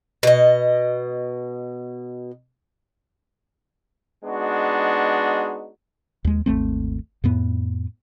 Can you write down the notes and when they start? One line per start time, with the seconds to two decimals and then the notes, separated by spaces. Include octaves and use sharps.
0.23 B2 D#5
4.24 G#3 B3 D4 D#4 F#4
6.25 D#2 G#3
6.46 G#1 D#2 A3 C4
7.24 F2 A2 B3